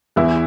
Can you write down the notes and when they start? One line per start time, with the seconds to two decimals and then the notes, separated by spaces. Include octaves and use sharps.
0.16 E2 E3 E4